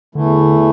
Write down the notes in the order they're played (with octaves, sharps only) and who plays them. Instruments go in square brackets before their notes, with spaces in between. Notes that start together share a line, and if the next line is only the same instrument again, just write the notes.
[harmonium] E2 E3 A3 [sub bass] D3